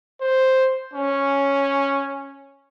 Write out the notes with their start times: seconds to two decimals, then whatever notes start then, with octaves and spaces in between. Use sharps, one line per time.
0.21 C5
0.94 C#4